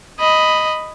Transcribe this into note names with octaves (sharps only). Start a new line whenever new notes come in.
D#5 B5